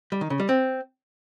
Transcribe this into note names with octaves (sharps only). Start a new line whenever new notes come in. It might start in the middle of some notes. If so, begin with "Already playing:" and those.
G3
D#3
C#3
G3
C4